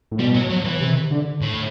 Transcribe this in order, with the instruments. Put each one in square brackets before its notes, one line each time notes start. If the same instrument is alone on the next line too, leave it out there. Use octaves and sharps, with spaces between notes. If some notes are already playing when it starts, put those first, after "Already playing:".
[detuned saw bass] A2
[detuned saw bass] B2 [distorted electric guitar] G3
[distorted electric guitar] F#3
F#3
E3
[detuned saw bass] C3
D3
[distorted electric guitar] A2